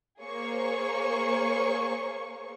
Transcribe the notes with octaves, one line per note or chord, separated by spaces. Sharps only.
A#3 G#4 C5 C#5 C#6